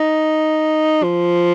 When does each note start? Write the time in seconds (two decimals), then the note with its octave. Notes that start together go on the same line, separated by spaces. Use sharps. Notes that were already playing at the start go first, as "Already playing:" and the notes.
Already playing: D#4
1.03 F3